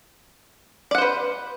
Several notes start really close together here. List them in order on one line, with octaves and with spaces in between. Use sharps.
D5 F#5 C5 B4